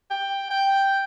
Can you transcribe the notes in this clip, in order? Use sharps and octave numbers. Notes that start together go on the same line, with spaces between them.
G5
G5